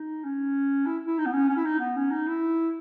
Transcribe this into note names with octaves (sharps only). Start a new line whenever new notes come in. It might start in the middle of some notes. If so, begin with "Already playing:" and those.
Already playing: D#4
C#4
E4
E4
D#4
B3
C#4
C#4
E4
D#4
B3
C#4
D#4
E4